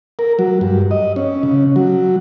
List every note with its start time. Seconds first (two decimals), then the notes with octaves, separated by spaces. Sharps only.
0.19 A#4
0.39 F#3
0.61 G2
0.91 D#5
1.16 C#4
1.43 C#3
1.76 F#3